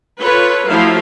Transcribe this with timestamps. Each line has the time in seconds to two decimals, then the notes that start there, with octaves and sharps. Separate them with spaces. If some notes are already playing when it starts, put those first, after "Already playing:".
0.21 F4 A4 B4 C#5
0.68 F3 F#3 A3 E4 F5